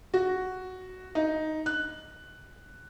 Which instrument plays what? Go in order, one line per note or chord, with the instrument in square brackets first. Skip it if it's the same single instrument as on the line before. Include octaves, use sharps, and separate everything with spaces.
[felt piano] F#4
D#4
F#6